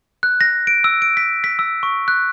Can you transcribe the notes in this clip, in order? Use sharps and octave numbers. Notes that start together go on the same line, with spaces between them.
F#6
A#6
D7
E6
D7
B6
B6
E6
C#6
F#6